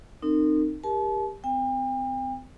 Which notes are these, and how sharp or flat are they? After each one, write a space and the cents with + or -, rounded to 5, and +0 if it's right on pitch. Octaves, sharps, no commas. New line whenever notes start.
C4 +0 D#4 -25 A#4 -35
G4 +25 A#4 +15 A5 -35
C4 -35 G5 +40